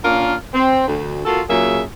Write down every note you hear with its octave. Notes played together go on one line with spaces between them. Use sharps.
A#2 A#3 C#4 D4 F4 A#4
C4
D2
A#3 F4 F#4 A4
A#2 C#3 F#3 A#3 G#4 E5